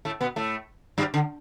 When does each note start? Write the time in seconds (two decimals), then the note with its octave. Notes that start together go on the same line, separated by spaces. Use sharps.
0.05 A2 A3
0.21 B2 B3
0.36 A2 A3
0.98 G2 G3
1.14 D3